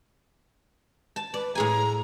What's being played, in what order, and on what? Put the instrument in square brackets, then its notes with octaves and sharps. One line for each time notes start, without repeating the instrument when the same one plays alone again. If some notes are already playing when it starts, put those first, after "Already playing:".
[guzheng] A5
[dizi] B4 [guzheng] D5
[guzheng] A2 G#4 G#5 [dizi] A#5